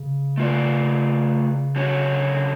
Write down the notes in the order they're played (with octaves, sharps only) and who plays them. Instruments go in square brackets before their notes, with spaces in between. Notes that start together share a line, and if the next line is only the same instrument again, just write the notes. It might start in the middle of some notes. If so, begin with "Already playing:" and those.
Already playing: [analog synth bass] C#3
[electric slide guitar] A3 F4 B4 D5
D3 F#3 C#4 F#4 C#5